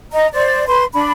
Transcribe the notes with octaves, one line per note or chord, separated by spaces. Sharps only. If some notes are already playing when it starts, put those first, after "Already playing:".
D#5 A#5
C5 D5
B4 C6
D4 B5